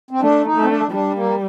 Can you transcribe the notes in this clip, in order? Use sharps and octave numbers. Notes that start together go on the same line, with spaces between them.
C4
A3 D4
D#4
A3
C4
D4
G3 D4
A#3